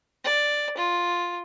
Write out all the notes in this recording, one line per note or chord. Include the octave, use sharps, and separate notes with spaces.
D5
F4